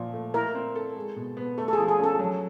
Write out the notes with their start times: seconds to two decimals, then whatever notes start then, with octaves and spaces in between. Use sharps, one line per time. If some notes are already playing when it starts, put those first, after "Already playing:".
Already playing: A#2 F3
0.13 A3
0.34 E4 A#4
0.55 C4
0.75 A4
0.96 G#3
1.16 B2
1.37 B3
1.58 A3 A4
1.68 A4
1.73 G#4
1.78 F3
1.88 G#4
1.98 C#4 A4
2.19 F#3